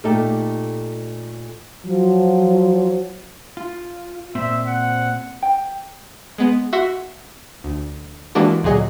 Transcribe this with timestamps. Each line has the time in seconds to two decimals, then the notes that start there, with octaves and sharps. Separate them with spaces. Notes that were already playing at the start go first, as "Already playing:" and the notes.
0.04 A#2 A3 D#4 G4 A4
1.85 F3 F#3
3.57 F4
4.35 A#2 C4 C5 E5
4.67 F#5
5.42 G5
6.38 G#3 B3
6.73 F#4 E5 F#5 C6 E6
7.64 D2
8.35 E3 G#3 A#3 D4 F#4 G4
8.63 D2 A#2 F#3 G#4 D#5 C#7